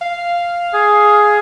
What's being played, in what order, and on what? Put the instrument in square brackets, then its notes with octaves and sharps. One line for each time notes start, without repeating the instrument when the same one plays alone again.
[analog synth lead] F5
[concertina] G#4